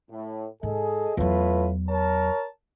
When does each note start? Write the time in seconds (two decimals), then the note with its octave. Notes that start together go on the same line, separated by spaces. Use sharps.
0.10 A2
0.63 G#2 G#4 A4 D#5
1.17 E2 A2 F#3 F4 B4
1.89 A#4 C#5 A5